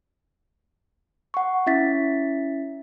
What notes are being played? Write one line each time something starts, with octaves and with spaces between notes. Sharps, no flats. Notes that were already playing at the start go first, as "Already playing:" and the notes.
F#5 C#6
C#4 E4 E5 A6 B6